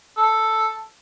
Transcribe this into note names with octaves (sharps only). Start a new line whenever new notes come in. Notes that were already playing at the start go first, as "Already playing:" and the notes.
A4